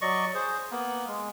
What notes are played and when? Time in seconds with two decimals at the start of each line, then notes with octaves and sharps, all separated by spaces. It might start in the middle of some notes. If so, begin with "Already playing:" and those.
0.02 F#3 D5 D#5 C#6
0.34 G#4 C5
0.71 A#3 B3
1.07 G#3